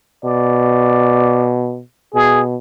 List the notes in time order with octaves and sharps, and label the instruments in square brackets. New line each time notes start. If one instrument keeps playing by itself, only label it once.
[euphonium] B2 [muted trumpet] D5
[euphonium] B2 [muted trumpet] G#4